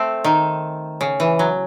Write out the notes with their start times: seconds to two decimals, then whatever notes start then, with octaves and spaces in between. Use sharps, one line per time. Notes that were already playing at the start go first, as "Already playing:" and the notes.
Already playing: A3 C4
0.24 D#3
1.01 C#3
1.20 E3
1.39 F#3